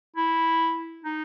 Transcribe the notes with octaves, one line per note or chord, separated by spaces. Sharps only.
E4
D#4